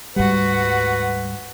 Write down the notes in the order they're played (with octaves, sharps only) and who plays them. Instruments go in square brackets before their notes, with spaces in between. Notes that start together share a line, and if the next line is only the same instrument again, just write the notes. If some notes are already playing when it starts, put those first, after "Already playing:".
[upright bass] D2 G#2 [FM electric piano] G3 [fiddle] F#4 F#5 [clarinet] B4